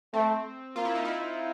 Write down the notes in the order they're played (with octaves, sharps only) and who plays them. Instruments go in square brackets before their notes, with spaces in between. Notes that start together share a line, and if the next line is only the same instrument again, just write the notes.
[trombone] A3 [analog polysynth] C4
[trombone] A#3 [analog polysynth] F4
[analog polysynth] E4
D#4
E4